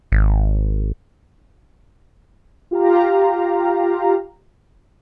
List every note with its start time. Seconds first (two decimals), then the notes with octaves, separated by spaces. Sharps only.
0.12 G#1
2.71 F4 G4 F5 A#5